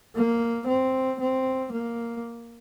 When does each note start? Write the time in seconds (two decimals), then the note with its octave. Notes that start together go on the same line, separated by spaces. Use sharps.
0.15 A#3
0.68 C4
1.20 C4
1.72 A#3